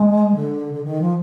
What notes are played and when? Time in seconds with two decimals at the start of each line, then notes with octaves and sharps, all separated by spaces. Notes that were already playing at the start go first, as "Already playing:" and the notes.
Already playing: G#3
0.35 D3
0.73 D3
0.83 D#3
1.01 F3